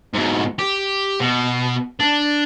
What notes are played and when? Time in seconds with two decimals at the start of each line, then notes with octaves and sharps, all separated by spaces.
0.14 G#2 B2
0.59 G4
1.20 B2
2.00 D4